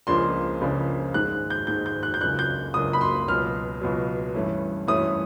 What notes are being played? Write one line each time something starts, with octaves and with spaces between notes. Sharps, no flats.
C#2 C#3 F3 A#3 D4 C6
C#2 C#3 F3 A#3 D4
G#2 D#3 G#3 F#6
G6
G#2 D#3 G#3 G6
G6
F#6
G6
C#2 C#3 F#3 A#3 D4 F#6
G6
C#2 C#3 F#3 A#3 D4 D#6
B5
C6
C#2 B2 F#3 F6
C#2 B2 F#3
G2 E3 A3 C#4
G2 E3 A3 C#4 D#6